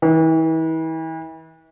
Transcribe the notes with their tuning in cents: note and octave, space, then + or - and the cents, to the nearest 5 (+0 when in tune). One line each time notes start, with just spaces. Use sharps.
E3 -40